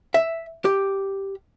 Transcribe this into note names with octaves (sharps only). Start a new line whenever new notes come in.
E5
G4